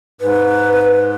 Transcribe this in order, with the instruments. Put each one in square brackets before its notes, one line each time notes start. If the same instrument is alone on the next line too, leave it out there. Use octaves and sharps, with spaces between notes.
[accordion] G#2 [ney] B4